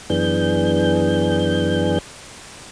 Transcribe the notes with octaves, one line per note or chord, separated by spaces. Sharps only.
F#2 E3 B3 D4 G#4 G6